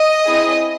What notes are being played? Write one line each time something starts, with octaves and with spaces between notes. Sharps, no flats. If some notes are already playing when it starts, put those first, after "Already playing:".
Already playing: D#5
C4 E4 G#4